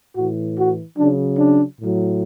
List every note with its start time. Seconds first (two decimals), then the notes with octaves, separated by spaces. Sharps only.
0.15 A2 E3 F#4
0.57 F#4
0.97 C#3 F#3 D4
1.38 D4
1.79 A2 F#3